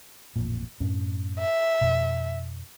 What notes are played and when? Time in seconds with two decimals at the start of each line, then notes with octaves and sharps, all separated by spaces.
0.36 A1 F2 A#2
0.80 F#2 A2 C#4
1.39 E5
1.81 F2 B2